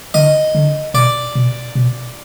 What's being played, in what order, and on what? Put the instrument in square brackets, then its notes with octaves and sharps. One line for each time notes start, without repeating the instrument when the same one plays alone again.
[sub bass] D3 [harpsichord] D#5
[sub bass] D3
[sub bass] B2 [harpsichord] D5
[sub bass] B2
B2